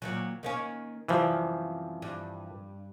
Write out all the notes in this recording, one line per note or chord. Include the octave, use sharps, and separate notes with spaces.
A#2 D#3 F#3
D#3 A#3 C#4
F#2 C3 E3 F3 G3
G2